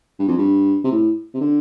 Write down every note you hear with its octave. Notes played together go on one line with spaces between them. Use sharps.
G2
F2
G2
C3
A2
C3
D3